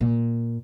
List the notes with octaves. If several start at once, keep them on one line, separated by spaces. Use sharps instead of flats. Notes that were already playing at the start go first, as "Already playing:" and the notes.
A#2